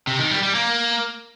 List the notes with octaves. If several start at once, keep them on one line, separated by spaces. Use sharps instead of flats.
C3
D#3
G3
G3
A#3